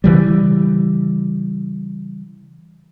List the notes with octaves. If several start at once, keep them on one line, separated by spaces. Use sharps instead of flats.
C#3 E3 G3